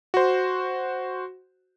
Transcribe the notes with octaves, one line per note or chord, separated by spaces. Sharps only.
F#4 C5